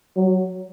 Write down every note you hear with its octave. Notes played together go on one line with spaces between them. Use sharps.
F#3